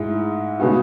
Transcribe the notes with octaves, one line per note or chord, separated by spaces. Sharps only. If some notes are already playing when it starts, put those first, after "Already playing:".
Already playing: G#2 G#3 E4
C#3 G#3 B3 F#4